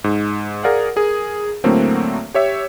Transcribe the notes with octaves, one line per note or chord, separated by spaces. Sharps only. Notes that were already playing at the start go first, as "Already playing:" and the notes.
G#2
G#4 A#4 D5 F5 F#5
G#4 A#4
A2 D3 F#3 A3 A#3 C4
G4 C#5 E5